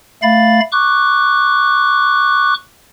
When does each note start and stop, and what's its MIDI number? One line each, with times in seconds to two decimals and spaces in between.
0.22 0.60 57
0.22 0.60 77
0.22 0.60 83
0.22 0.60 93
0.72 2.54 85
0.72 2.54 86
0.72 2.54 90